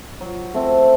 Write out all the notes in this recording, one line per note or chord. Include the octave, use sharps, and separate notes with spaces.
F#3
A3 C4